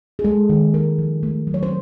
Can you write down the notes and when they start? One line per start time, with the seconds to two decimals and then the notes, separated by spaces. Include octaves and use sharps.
0.19 G#4
0.24 G#3 A4
0.49 D#3
0.74 G#3 A#4
0.98 F3
1.23 A3
1.47 F#3
1.54 C#5
1.63 C5